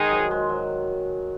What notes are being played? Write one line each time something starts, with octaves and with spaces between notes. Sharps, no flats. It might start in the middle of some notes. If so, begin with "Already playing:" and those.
Already playing: D#3 G#3 D#4 G#4
F#3
G#3
F#3